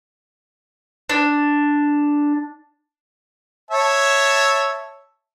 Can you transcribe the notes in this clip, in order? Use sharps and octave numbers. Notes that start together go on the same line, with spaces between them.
D4
C#5 E5 A5